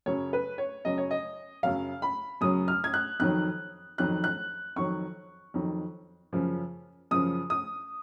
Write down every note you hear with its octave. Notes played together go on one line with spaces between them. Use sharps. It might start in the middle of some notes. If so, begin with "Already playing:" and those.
F#2 C#3 F#3 C#5
B4
C#5
F#2 C#3 F#3 D#5
C#5
D#5
F#2 C#3 F#3 F5
B5
F#2 C#3 F#3 D#6
F6
G#6
F#6
F2 D#3 F#3 F#6
F2 D#3 F#3 F#6
F#6
F2 D#3 F#3 C#6
F2 D#3 F#3
F#2 C#3 F3
F#2 C#3 F3 D#6
D#6